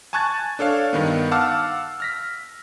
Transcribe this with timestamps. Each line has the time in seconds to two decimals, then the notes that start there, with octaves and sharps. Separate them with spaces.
0.13 G#5 A5 C#6 F#6 G#6 A6
0.59 D4 A4 C#5 F5
0.93 G2 D#3 B3
1.31 F5 F#5 A5 D6 E6 F6
2.00 F6 A#6 B6